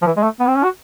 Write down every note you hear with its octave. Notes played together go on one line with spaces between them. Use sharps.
F3
E3
G#3
A3
B3
C4
C#4
F#4